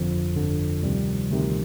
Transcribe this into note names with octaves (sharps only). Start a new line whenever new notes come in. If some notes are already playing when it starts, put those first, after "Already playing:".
Already playing: G1 F2 D3 F3
G1 F2 D3
D2 C3 D#3 G3
D2 C3 D#3